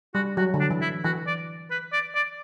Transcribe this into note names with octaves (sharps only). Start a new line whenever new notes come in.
G3 F#4
F#3 F#4
D3
D4
E3
E4
E3 F#4
D5
B4
D5
D5